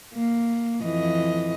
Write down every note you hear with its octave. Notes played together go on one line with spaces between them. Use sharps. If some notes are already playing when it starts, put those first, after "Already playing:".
A#3
F2 E3 D#5